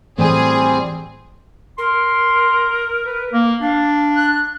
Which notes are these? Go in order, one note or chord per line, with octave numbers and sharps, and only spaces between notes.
A2 E3 G3 A3 C4 G#4
A#4 C6
B4
A#3
D4 F5
F#6